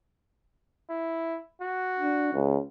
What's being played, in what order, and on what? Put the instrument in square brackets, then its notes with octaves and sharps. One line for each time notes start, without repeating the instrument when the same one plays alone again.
[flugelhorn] E4
F#4
[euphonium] D4
C#2